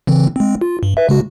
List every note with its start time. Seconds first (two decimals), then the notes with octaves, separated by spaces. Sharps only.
0.07 C#3 E3 C4
0.36 G#3 C4
0.61 F4
0.83 G2
0.97 B4 E5
1.09 C#3 G#3 F#4